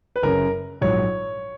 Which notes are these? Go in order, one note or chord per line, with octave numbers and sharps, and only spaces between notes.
B4
F#1 F#2 C#3 A#4
A#1 G#2 F#3 C#5